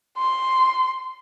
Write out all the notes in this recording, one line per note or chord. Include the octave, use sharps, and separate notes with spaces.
C6